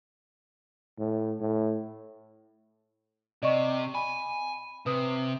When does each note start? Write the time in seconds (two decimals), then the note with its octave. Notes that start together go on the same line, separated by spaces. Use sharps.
0.98 A2
1.40 A2
3.43 C3 D5 D#5 C#6
3.95 G#5 B5
4.86 C3 B4 D#6